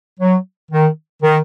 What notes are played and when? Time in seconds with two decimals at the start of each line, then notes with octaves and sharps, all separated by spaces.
0.20 F#3
0.72 D#3
1.23 D#3